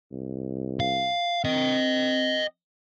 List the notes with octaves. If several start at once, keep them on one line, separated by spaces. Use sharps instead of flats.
C2
F5
C4 D#5 G5